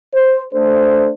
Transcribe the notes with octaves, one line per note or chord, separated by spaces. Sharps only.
C5
A3 D4 A4 C5